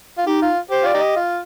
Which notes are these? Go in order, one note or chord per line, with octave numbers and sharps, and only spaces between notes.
F4
D#4 G4
F4
G4 C5
F4 D5
D#4 G4
D#5
F4